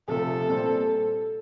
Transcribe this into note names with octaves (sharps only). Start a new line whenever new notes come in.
C3 F3 A3 A4
A#2 G3 C4